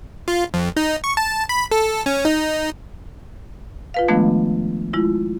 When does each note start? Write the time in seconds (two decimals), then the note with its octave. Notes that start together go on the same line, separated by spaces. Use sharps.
0.28 F4
0.54 F2
0.77 D#4
1.04 C#6
1.17 A5
1.49 B5
1.72 A4
2.06 C#4
2.25 D#4
3.94 F4 B4 F5
4.08 D#3 F3 G#3 A3 B3 D4
4.93 G#3 E4 F4